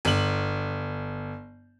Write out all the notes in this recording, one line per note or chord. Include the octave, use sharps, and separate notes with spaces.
G1 F#7